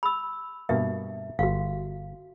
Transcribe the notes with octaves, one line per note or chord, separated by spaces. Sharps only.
B5 E6
G2 B2 A#3 E5
G1 F#4 F5